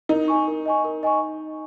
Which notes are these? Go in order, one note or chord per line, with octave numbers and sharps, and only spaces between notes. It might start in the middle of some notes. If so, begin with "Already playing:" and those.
D#4 A#4
D#5 G#5 C#6
A#4
D#5 G#5 C#6
A#4
D#5 G#5 C#6